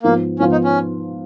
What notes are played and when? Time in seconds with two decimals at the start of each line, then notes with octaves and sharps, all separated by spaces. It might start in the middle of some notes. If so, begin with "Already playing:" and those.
0.03 G#2 F3 A#3 B3 F4
0.39 G#2 F3 B3 C#4 F4
0.52 D#4
0.64 C#4